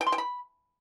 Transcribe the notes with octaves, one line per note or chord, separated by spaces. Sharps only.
G5
C6
G5
B5